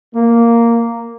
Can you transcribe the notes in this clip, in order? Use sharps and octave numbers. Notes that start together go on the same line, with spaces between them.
A#3